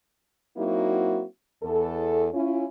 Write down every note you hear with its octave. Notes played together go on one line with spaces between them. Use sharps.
F#3 A#3 C4 D#4 E4 F#4
E2 A4
C#4 E4 F4